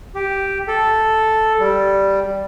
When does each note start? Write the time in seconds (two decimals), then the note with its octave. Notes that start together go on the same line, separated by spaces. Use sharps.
0.15 G4
0.68 A4
1.60 G3